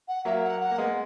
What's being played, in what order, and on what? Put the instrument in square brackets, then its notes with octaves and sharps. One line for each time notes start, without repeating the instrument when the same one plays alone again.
[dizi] F#5
[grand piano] F#3 A#3 [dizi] E5
[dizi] F#5
F#5
[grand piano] A#3
G#3 B3